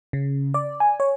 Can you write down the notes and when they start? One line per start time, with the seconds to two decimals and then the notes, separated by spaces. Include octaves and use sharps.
0.13 C#3
0.54 D5
0.80 G#5
1.00 C#5